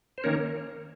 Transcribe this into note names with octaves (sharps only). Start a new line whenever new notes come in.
C5
D#3 A#3 C#4 A#4 C#5